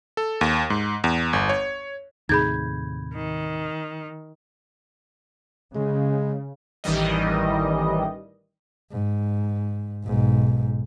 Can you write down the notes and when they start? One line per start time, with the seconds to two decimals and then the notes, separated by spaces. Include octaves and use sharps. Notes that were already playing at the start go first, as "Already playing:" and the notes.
0.17 A4
0.41 D#2
0.70 G#2
1.04 E2
1.33 G1
1.49 C#5
2.29 D#2 A2 C3 D#4 G#4 B5 G6 G#6
3.14 D#3
5.75 C#3 G#3
6.84 A1 D#3 E3 G3 D#5
8.92 G#2
10.04 B1 G#2